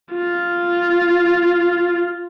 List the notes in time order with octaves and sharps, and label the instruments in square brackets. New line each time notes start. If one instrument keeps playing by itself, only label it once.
[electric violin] F4